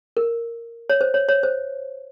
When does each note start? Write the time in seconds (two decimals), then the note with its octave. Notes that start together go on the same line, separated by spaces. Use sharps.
0.17 A#4
0.90 C#5
1.01 C5
1.14 C#5
1.29 C#5
1.43 C5